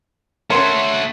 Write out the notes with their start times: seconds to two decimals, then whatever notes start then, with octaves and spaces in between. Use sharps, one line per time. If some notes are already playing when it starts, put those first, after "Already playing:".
0.50 A3 C#4 F#4 A#4 C#5 C6